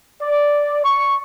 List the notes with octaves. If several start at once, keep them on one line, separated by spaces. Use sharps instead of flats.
D5
C#6